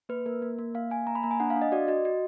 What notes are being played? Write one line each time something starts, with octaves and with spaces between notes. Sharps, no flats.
A#3 B4
A#3 A#4
A#3
A#3
A#3 F5
A#3 G#5
A#3 A#5
B5
A#3 A#5
G#5
D4 F#5
F5
D4
D#5
F#4 D5
F#4 D#5
F#4